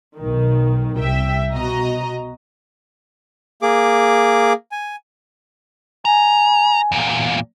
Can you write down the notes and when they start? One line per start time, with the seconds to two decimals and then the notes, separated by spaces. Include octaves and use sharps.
0.18 B1 D#3
0.98 C2 E5 G5
1.53 B2 F#4 D#5 A#5
3.62 A#3 G#4 D6
4.72 G#5
6.05 G#5 A#5
6.92 E2 A#2